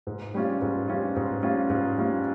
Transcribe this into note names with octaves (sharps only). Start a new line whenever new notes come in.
G#2
G3 C#4 F4
G#2
G3 C#4 F4
G#2
G3 C#4 F4
G#2
G3 C#4 F4